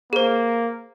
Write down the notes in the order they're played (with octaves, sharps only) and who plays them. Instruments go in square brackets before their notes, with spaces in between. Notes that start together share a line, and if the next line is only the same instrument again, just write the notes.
[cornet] A#3 [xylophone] G#4 C5